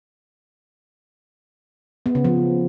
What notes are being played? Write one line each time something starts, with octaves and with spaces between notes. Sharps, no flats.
B3
C#3
F3